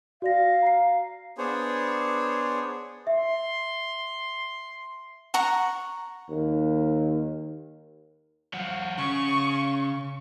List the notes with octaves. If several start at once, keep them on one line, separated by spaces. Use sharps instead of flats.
F#4 D5 F5 A#6
A#5 C7
B3 D4 G#4 C5 C#5
E5 C6
F#5 A#5 C#6
D#2
F3 F#4
C#3 C#6